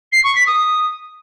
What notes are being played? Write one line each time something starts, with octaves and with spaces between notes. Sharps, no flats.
C7
C#6
B6
D#6